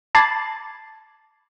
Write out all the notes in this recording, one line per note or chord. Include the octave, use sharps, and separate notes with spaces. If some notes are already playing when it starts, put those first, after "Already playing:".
A5 B5 D6 G#6 A6 C7